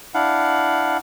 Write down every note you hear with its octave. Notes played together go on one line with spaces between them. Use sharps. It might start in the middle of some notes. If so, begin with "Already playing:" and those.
D4 E4 F5 F#5